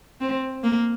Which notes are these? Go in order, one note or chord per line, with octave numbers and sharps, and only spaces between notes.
C4
A#3